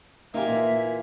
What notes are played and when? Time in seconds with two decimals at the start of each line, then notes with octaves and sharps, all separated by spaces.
0.34 A#3 D#4 F4 G4 E5 G#5
0.47 A#2 E3